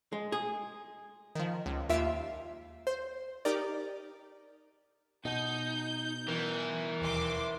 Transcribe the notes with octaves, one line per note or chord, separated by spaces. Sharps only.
G#3
G#4
D#3 F3
C#2
D#2 F4 E5 D7
C5
D#4 G4 A#4 D5
B2 D#4 G6
E3 E4 A#4
E1 D#2 E5 C6 D6